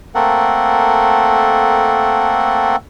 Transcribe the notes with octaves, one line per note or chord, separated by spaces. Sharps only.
A3 A#3 C4 A4 A#4 F#5